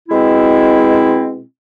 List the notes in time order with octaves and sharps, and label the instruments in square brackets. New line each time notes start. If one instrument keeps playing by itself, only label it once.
[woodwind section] B2 G#3 C4 E4